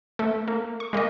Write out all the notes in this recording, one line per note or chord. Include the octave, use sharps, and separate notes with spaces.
A3
A#3
C#6
G#3 A#3 A#4 D#5